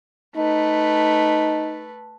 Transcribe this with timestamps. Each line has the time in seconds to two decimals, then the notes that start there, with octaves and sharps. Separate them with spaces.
0.36 A3 D#4 B4